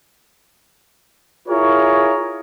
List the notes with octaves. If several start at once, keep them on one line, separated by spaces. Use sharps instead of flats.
E4 F4 G#4 A#4 C#5